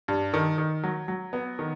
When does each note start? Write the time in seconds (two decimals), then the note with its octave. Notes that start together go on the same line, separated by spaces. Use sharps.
0.08 G2
0.34 D#3
0.58 D#3
0.83 F#3
1.08 F#3
1.33 B3
1.59 D#3